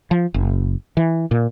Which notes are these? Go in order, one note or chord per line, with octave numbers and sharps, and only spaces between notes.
F3
F#1
E3
A#2